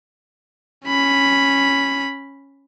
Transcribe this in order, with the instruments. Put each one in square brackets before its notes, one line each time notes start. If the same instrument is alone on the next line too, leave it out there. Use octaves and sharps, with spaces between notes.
[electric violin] C#4 B5